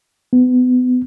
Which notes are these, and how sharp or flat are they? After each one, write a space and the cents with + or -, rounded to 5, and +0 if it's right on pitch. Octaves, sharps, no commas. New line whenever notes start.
B3 +30